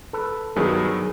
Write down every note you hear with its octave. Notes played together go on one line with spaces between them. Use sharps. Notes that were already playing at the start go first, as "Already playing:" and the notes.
A4 B4
G2 D#3 F#3 B3 G#4 A#4